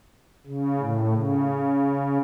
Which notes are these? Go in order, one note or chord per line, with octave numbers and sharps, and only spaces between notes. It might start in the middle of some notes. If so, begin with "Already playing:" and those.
C#3
A2
C#3